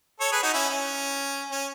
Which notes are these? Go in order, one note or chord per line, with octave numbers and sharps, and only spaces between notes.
A4 C#5
G#4 B4
D#4 F#4
C#4 E4
C#4
C#4